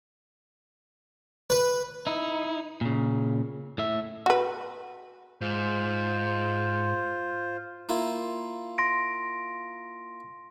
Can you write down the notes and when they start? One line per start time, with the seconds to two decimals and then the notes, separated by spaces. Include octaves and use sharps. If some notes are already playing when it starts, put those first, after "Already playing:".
1.50 B4
2.07 D#4 E4
2.81 A#2 C#3
3.78 A2 E5
4.26 F#4 B4
5.41 G#2 F4 C5
7.89 A#3 E4 F4
8.78 C6 A#6 D7